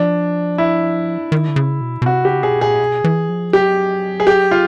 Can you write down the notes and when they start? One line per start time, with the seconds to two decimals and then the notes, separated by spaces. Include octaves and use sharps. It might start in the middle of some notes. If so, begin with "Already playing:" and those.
Already playing: F3 D4
0.58 E4
1.32 D#3
1.49 D3
1.56 C#3
1.81 B2
2.02 B2
2.06 C3 F#4
2.25 C#3 G4
2.43 B2 G#4
2.61 A#2 G#4
2.80 B2
3.04 E3
3.29 F3
3.53 F#3 G4
4.20 G#4
4.27 G4
4.51 F4